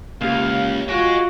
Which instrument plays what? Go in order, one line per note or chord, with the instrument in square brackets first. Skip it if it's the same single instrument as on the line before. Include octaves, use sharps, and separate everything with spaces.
[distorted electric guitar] C#2 [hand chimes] A#3 G4 [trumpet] F5
[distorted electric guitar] G#3 [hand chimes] F4 F5 D7 [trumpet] F#4